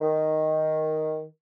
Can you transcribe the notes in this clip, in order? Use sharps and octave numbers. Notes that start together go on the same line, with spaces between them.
D#3